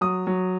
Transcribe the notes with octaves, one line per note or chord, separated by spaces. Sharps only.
F#3 D#6
F#3